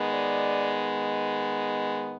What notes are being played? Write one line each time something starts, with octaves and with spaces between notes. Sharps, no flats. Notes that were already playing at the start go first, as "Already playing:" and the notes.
Already playing: D#3 G#3 B3
D5